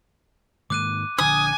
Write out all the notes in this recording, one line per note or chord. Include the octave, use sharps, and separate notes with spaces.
G#2 D#3 A#3 D6 F#6 D#7
A#1 D3 D4 G#5 D#6